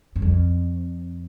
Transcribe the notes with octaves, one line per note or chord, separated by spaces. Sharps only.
G2
F2